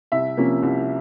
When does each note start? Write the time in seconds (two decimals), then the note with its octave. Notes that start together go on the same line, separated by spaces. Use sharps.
0.12 C2 E5
0.37 C3 F3 A#3 C#4
0.63 C2